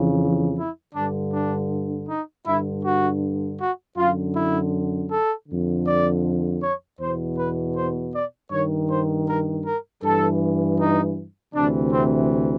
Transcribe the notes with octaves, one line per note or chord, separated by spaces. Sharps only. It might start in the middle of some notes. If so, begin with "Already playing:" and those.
Already playing: F2 C#3 E3
E4
G2 D3 D4
D4
D#4
G2 D3 E4
F#4
F#4
F#2 D3 F4
E4
A4
F2 D3
D5
C#5
E2 B2 C5
B4
C5
D5
G2 D#3 C#5
C5
A#4
A#4
G2 E3 A4
D#4
D2 C3 E3 D4
C4